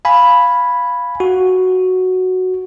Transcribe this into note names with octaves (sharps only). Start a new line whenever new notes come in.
F5 G#5 B5
F#4